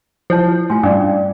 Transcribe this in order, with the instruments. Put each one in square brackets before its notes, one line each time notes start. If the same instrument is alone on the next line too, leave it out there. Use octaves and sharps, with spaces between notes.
[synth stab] F3 [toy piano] E4 C#5 A5
[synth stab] A2 [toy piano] F4 G#5 C6
[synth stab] G2 [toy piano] C#4 D5